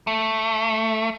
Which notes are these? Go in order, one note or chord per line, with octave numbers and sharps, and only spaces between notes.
A3